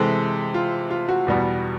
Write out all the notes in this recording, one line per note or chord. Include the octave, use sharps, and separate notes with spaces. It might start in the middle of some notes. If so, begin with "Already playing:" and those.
Already playing: C3 E3 G#3 A4
F4
F4
F#4
E2 B2 G3 B3